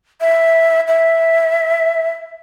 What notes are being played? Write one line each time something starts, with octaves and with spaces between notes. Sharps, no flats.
E5
E5